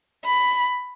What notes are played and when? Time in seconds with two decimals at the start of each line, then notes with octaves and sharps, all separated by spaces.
0.24 B5